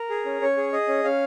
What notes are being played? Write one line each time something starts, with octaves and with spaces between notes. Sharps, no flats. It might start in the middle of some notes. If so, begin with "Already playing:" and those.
Already playing: A#4
G#4
C#4
C#4 C#5
G#4
G#4 D#5
C#4
C#4 F5